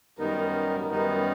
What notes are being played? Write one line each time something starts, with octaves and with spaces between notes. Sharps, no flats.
F#2 D#3 G3 B3 D#4 A#4
A#4
F#2 D#3 G3 B3 D#4 B4